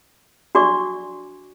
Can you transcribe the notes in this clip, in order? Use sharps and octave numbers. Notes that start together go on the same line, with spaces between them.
D4 F#4 D5 C#6 D6